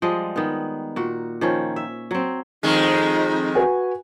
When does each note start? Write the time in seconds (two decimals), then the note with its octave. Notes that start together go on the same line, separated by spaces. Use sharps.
0.02 F3 G3 G#3 D#5
0.36 D#3 B3
0.96 A#2 F#4
1.41 D#3 F3 C#4
1.76 E5
2.11 F#3 C4
2.63 F2 D#3 G#3 D#4
3.55 F#4 B4 G#5